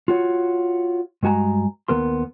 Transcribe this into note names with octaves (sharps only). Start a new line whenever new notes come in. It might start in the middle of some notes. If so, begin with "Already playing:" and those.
F4 F#4 C#5
G2 G#3 F#4 G#5 A#5
D#2 B3 A#4 C6